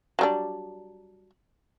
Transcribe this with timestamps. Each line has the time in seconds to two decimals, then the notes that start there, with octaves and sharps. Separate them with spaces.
0.19 F#3 G3 D4